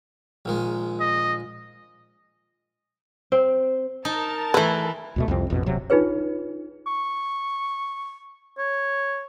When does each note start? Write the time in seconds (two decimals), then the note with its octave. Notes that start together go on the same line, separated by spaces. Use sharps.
0.45 A#1 D#3 G#3
1.00 D#5
3.32 C4
4.05 D#4 A#4 A5
4.54 E3 A3 E4 B4
5.16 D2 B2 A3
5.28 C2 F2 C4
5.50 A1 F2 B2
5.66 D#1 C3 F#3
5.90 D4 D#4 F4 G#4 B4 C#5
6.87 C#6
8.58 C#5